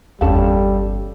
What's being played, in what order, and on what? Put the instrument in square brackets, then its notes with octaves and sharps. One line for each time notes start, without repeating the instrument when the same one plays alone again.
[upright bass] G1 E2 [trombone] G3 [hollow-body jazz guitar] C#4 A4 F5